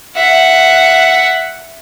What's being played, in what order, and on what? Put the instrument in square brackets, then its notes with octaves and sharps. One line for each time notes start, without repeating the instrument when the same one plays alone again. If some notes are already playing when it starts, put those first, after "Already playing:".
[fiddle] E5 F#5